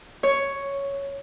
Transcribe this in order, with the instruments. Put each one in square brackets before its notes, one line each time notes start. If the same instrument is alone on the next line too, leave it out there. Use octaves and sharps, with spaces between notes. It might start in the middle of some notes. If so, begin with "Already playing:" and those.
[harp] C#5